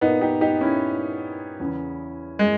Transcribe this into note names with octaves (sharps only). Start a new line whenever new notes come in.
A#2 B3 D#4
D#4 G4
D#4 G4
C#4 E4
E2 C#3 E3
G#3